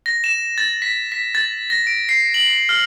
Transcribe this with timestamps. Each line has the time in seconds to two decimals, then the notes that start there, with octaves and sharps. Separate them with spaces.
0.06 A#6
0.24 E7
0.58 A6
0.82 B6
1.12 B6
1.35 A6
1.70 A#6
1.87 D7
2.09 C7
2.34 F#7
2.69 F6